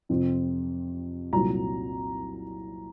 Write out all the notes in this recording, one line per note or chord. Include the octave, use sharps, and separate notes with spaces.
F2 C3 F3 C4
C2 A#2 F#3 A#5